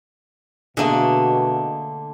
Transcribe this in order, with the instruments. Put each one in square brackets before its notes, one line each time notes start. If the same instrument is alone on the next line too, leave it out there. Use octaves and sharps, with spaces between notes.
[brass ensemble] B2 [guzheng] D3 D4 [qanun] A3 A#3 G#4